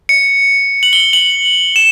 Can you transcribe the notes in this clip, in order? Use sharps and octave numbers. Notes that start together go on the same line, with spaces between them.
C#7
F#7
G7
F#7
E7